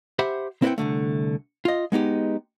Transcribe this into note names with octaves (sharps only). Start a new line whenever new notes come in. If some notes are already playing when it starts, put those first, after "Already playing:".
G4 C5 E5 F#5 B5
C4 E4 B4 D5 F#5 G5
C2 A#2 D3 A3
F4 D#5
G#3 B3 D#4 G4